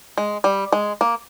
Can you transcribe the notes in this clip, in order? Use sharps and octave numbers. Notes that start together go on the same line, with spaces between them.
G#3
G3
G#3
A#3